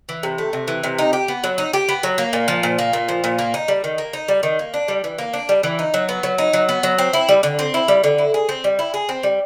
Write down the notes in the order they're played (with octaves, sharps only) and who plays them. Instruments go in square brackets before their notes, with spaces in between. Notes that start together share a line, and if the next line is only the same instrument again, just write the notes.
[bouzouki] E3
C3
A3
C3
E3
C3
D#4
G4
B3
F#3
D#4
G4
B3
F#3
A#3
A#2
F3
A#2
A#3
A#2
F3
A#2
A#3
D#4
G3
D#3
A#3
D#4
G3
D#3
A#3
D4
G3
E3
A#3
D4
G3
E3
D#4
F#3
B3
F#3
D#4
F#3
B3
F#3
C4
E4
G3
D3
C4
E4
G3
D3
E4
G#4
C4
G3
E4
G#4
C4
G3